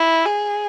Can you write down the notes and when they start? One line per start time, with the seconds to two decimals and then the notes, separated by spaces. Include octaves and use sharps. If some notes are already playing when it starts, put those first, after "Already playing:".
Already playing: E4
0.25 G#4